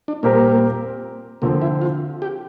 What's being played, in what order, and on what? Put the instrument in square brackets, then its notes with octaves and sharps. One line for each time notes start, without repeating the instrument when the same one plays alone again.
[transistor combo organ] D4
[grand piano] A#2 G3 C4 G4 A#4 [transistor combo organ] A#3
[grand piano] D3 F3 C4 [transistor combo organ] A#3
[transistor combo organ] E4
F4
G4